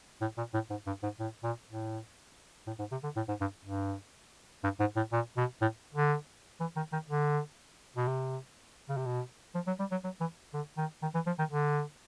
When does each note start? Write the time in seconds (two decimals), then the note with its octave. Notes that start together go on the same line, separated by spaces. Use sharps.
0.21 A2
0.38 A#2
0.54 A2
0.70 G#2
0.87 G2
1.03 G#2
1.19 A2
1.44 A#2
1.69 A2
2.67 A2
2.79 G#2
2.91 C3
3.03 D3
3.16 A2
3.28 G#2
3.41 G2
3.65 G2
4.63 G2
4.80 G#2
4.96 A2
5.12 A#2
5.37 B2
5.61 A2
5.94 D3
6.60 E3
6.76 D#3
6.93 D#3
7.09 D3
7.97 B2
8.07 C3
8.89 C#3
8.97 C3
9.06 B2
9.55 F3
9.67 F#3
9.79 G3
9.91 F#3
10.04 F#3
10.20 E3
10.53 D3
10.77 D#3
11.02 D#3
11.14 E3
11.27 F3
11.39 D#3
11.51 D3